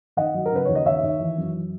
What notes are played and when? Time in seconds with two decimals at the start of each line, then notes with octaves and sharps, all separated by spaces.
0.17 D#3 D#5 F#5
0.34 F#3
0.46 A#4
0.52 C#3 B4
0.65 D#2 C#5
0.75 D#5
0.86 D#3 C#5 E5
1.03 D#3
1.20 E3
1.38 F#2